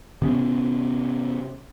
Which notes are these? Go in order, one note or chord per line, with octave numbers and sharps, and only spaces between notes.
C3 B3 C#4